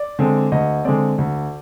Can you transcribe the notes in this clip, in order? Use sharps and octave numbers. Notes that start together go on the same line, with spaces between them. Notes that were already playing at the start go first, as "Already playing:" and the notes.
Already playing: D5
D3 G#3 C4
D2 D#5
D3 G#3 C4 D5
D2